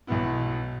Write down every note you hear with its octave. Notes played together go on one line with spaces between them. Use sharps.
B1 B2 B3 E4